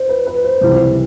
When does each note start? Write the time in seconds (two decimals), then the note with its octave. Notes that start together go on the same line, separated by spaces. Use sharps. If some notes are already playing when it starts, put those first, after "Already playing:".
Already playing: C5
0.09 B4
0.27 B4
0.44 C5
0.61 C#2 C3 E3 G3 C5